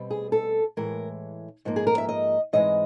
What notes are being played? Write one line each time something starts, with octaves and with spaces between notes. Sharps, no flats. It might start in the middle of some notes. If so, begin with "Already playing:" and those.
Already playing: B2 G3 C4
G#4
A4
A2 E3 G#3 A#4
G#2 F3 A#3
G#4
A#4
E5
D#5
G#2 E3 G#3 C4 D#5